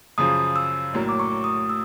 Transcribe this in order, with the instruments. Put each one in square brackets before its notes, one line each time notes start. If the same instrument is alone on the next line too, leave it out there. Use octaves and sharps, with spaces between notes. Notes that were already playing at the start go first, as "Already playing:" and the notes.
[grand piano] F#2 C#3 F3 [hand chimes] D#6
[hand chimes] E6
[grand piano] A#1 A2 F#3 A#3
[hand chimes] D6
C#6
D#6
E6